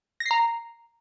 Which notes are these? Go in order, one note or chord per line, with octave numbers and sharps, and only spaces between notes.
A#6
C7
A#5